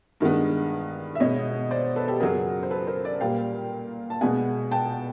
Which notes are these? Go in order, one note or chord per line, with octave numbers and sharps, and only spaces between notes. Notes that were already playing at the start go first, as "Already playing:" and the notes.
G2 D#3 G#3 B3
E5
B2 G#3 B3 C#5 D#5
C5 D5
A4 B4
G4 A4
F#2 C#3 F#3 G#4 A#4
C5
A4 B4
A#4 C5
C5 D5
A#2 G3 A#3 F5 G5
A5
B2 G#3 B3 F#5 G#5
G5 A5